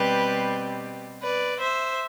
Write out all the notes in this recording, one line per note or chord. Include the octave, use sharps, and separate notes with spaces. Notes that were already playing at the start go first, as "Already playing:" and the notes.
Already playing: B2 G3 C4 G4 B4
B4 D5
C5 E5